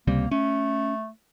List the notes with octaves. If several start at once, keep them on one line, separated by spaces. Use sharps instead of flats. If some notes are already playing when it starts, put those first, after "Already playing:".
C#2 C3 G3 A#3
A3 C#4